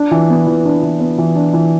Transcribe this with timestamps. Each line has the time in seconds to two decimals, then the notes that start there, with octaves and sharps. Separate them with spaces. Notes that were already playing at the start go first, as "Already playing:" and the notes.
Already playing: D4
0.11 E3
0.30 B3
0.47 E3
0.65 D4
0.83 E3
1.00 B3
1.18 E3
1.36 D4
1.53 E3